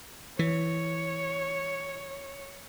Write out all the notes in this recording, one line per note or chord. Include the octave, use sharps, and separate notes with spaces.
E3 C#5